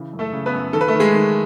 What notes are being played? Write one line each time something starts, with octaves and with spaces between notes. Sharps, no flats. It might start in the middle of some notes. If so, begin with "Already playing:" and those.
Already playing: C#3 E3
F#2
A3 A4
C#3
B3 B4
F#2
D#3 A4
B4
A3 A4
D#3
G#3 G#4
D#3